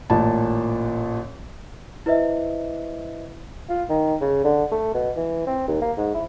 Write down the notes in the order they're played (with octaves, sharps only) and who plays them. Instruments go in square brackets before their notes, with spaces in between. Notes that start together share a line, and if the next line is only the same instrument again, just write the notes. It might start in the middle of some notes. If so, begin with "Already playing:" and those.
[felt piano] A1 A#2 A5
[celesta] E4 B4 C5 D#5 E5
[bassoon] F4
D#3
C#3
D3
A3
B2
E3
C4
D#2
A#3
G#2
E4